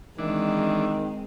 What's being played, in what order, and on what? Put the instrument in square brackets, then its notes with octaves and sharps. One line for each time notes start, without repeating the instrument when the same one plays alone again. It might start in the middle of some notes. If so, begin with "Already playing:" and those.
[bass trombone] D#3 [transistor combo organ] E3 D4 [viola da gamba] G#3 C4